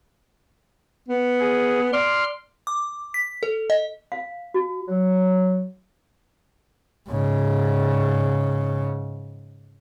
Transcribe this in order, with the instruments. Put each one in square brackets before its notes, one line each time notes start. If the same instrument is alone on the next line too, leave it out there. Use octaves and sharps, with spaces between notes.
[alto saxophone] B3
[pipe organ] G#4
[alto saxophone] D5 [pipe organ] C6 F6
[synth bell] D6
B6
A4
D#5
[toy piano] F5
F#4
[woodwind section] F#3
[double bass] G#2 C#3